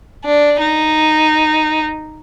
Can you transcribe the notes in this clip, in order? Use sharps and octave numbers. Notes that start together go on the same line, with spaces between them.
D4
D#4